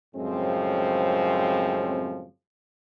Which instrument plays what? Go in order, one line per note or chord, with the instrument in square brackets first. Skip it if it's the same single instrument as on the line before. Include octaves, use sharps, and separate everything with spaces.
[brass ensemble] F#2 A2 C#3 F3 G#3 C4